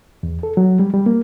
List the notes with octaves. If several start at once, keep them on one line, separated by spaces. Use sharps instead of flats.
E2
A4
F#3
G3
G3
A#3